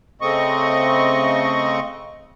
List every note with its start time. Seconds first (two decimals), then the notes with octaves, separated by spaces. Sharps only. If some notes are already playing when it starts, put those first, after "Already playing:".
0.21 C#3 A3 C4 D#5 C#6